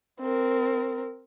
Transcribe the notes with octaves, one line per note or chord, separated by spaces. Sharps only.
C4 A#4